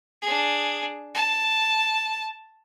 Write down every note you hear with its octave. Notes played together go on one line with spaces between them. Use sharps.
D4 G#4
A5